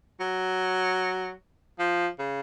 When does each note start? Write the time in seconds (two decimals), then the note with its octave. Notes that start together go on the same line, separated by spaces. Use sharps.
0.20 F#3
1.79 F3
2.19 C#3